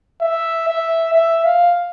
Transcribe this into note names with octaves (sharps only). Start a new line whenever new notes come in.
E5
E5
E5
F5